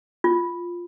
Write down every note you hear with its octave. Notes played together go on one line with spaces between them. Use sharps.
F4